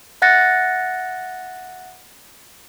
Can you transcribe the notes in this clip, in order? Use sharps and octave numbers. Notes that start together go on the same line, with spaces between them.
E5 F#5 F#6 A6 A#6 C#7